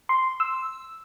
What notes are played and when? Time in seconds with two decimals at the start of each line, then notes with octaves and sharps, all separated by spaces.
0.09 C6
0.40 E6